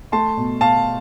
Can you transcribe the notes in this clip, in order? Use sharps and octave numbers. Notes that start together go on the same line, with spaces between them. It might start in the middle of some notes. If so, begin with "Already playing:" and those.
A3 A5 C6
B2
B2 F5 A5